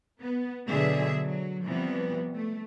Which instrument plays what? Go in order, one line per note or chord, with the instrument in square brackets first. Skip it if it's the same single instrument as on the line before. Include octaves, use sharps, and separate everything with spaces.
[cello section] B3
B2 D3 F#3 G#4 E5
F#3
C3 E3 F3 G3 B3
A3